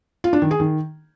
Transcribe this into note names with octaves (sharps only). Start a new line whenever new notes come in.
F4
D4
D#3
G#4
D#3